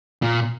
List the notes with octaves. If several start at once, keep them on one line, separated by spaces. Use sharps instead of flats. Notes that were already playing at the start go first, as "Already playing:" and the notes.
A#2